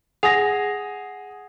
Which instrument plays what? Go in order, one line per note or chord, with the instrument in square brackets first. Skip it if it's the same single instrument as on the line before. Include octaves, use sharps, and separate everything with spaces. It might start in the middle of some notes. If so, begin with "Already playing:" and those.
[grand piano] G#4 A#6 [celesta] F#5 D#6 F7